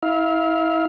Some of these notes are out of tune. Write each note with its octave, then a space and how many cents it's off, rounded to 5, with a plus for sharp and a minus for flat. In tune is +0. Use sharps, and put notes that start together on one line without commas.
E4 -30 F5 +0